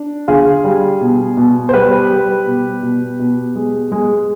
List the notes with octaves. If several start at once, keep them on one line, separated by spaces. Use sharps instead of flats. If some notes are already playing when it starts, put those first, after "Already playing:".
Already playing: D4
D3 F4 G#4
G3
B2
B2
C5
G3 G4 B4
G3
B2
B2
B2
G#3
G#3